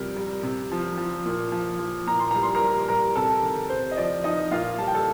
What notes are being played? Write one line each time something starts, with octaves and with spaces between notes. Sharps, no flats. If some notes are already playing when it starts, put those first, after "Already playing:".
Already playing: C3 F3 G3 A#4
G3
C3
F3
F3
A#2
F3
F3
A#2 A#5
C6
G3 A#5
C6
A#4 A#5
G3
G3 A#4 A#5
C3 A4 A5
D#3
C3 C5
D#5
F3 D5
F3 D#4 D#5
A#2 F4 F5
G3 A5
G5
A4 A5